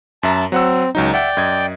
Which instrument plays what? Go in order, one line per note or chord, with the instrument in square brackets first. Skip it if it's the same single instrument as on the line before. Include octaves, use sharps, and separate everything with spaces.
[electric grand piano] F#2 E5 A#5 [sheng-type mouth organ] A5
[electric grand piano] F#3 F#5 E6 [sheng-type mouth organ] C4
[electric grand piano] C#2 F#3 D#4
[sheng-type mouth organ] D5 G5 [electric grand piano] E5 F#5
[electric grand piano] F#2 D#5 G#6